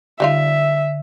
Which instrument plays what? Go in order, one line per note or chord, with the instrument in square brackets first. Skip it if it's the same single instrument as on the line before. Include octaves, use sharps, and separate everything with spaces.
[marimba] D3 [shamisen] G3 D#4 F4 [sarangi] E5